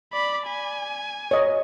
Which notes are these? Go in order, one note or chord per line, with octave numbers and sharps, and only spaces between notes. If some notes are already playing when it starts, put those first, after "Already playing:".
D5 B5
G#5
C#5 D#5